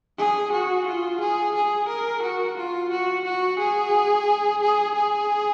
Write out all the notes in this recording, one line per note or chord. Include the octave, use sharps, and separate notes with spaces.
G#4
F#4
F4
G#4
G#4
A#4
F#4
F4
F#4
F#4
G#4
G#4
G#4